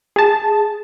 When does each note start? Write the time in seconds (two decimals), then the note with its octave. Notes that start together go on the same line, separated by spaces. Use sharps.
0.16 G#4 A5